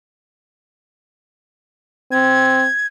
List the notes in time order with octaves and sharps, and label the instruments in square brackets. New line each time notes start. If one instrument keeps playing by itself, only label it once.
[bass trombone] C4 [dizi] G#6